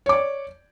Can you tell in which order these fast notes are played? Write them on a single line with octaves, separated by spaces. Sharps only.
C#5 D6 D5